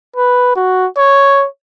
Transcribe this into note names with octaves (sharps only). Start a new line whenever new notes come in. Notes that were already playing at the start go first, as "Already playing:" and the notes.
B4
F#4
C#5